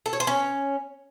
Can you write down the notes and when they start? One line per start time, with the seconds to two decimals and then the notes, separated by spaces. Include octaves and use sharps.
0.06 A4
0.13 C#5
0.20 C5
0.27 C#4